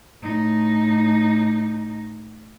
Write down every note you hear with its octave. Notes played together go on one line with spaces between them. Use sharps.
A2 D#4